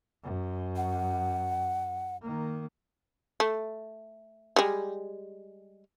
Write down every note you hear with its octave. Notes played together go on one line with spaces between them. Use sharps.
F#2
F#5
D#3 A#3
A3
G3 G#3